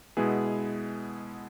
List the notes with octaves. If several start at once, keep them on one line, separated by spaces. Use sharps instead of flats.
B2 G#3 B3 E4 G#4